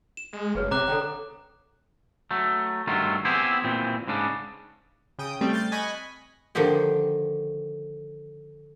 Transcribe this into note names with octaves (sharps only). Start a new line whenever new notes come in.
E7
G#3
F#1 G#4 B4 C#5
C3 C#5 A#5 D6 F#6
D3 A4 C#5 G5
F#3 A3
G2 D#3 F#3 A3 F4
B3 C4 E4 G4 G#4
A#2 E3 C4
G#2 C#3 D4
C#3 G5 D#6
G3 A3 C4 G5
F6 G6 A6
D#5 G#5 B5 C#6 F#6
D3 D#3 F3 G4 D5